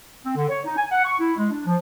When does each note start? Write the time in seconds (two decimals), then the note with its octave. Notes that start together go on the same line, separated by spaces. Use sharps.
0.24 C4
0.36 D3
0.49 C#5
0.65 D#4
0.77 G#5
0.92 F#5
1.05 C#6
1.19 E4
1.37 G#3
1.51 D4
1.66 F3